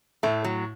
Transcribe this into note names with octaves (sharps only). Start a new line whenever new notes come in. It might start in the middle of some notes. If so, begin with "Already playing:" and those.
A2 A3
F#3